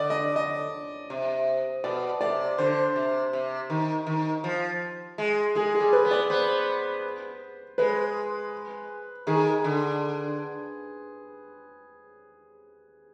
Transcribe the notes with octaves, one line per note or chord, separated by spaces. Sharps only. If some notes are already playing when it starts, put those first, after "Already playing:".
Already playing: D3 D5 D#5
D#5
D#5
C3
B2 D5
C3 D5
D3 C5
C3
C3
D#3
D#3
F3
G#3
G#3 G#4
G#4
G3
B4
B3
D5
B3 C5
G#3 B4
D#3 G#4
D3